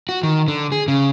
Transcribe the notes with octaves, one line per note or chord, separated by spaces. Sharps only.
F#4
D#3
D3
G#4
C#3